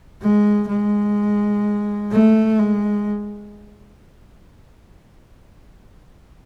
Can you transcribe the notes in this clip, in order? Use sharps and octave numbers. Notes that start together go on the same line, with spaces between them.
G#3
G#3
A3
G#3